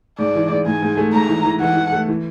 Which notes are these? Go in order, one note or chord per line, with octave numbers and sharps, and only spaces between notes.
G#2 D5
E3
G#2
G#2 G#5
G#2
A3
G#2 A#5
E3
E3
E3 F#5
E3
A3
E3